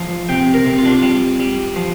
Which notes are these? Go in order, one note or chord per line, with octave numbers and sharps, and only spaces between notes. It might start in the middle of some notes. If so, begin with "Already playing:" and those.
Already playing: F3
C3 G5
A#4
C3
F4
D4
F4
G3
G3
F3